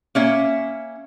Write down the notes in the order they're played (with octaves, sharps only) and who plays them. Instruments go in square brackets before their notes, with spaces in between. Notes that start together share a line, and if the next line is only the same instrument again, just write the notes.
[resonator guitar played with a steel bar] A#3 C#4 E5